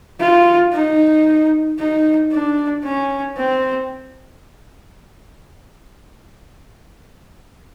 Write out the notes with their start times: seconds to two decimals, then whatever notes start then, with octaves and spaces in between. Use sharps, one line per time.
0.20 F4
0.73 D#4
1.78 D#4
2.32 D4
2.84 C#4
3.37 C4